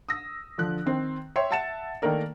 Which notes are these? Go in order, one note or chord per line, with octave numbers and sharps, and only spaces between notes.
D#6 E6 A#6
D3 F3 F#6
D#3 C4
C#5 E5 G5 C6
E5 F#5 A5 A6 C#7 E7
D#3 A3 A#3 A#4 D5